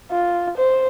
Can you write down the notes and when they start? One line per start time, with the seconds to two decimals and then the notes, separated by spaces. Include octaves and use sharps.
0.11 F4
0.57 C5